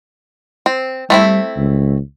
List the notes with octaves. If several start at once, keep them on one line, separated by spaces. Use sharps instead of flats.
C4
G3 A3 C4 E4
C#2